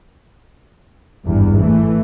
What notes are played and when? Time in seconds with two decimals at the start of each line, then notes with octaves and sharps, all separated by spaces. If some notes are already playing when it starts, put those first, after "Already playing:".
1.25 G#1 E2 G2
1.60 E3 A3